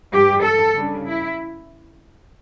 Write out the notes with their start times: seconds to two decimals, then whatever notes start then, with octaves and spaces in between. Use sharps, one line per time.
0.12 G2 E3 G3 G4
0.42 A4
0.73 C#3 G3 D4
1.04 E4